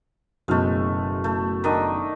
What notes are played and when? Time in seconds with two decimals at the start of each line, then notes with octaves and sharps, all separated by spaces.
0.48 F#1 B2 G#3 A3 F6
1.24 A3
1.64 D#3 D4 D#5